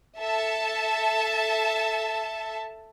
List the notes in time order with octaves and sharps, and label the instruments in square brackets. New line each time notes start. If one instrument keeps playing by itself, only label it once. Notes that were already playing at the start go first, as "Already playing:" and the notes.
[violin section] A4 E5 A5